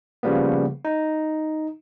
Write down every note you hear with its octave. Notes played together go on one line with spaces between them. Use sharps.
C#3 F3 G3 A#3 B3
D#4